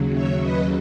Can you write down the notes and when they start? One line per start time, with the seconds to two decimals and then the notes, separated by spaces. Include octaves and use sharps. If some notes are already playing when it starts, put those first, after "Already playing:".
Already playing: D#2 C#3 F#3
0.13 C#5 E5
0.41 B4 D#5